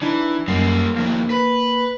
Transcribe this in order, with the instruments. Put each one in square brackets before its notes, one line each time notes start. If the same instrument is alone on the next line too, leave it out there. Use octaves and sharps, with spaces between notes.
[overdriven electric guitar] E3 [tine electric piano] D4 D#4
[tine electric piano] F#2 C7 [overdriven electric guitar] G3 A#3
[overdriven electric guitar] F2 D#3 [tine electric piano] A#3
[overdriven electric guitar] B4